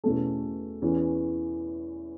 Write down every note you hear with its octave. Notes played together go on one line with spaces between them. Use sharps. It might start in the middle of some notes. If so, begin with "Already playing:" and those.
E2 B2 A3 C#4 A4
E2 E3 C#4